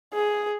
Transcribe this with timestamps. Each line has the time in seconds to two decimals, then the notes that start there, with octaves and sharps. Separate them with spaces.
0.13 G#4